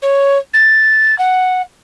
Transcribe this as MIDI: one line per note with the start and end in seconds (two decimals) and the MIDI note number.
0.02 0.38 73
0.54 1.18 93
1.19 1.62 78